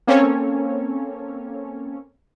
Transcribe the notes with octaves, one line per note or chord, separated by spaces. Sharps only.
A#3 C4 C#4 A4 C#5